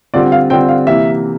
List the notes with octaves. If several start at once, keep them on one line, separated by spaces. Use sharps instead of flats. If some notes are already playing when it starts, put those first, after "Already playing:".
D3 G3 C4 F4 D5
F5
D3 G3 C4 F4 G5
F5
C3 E3 A#3 E5